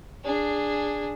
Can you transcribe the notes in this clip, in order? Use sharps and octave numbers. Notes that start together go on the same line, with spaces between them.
D4 G#4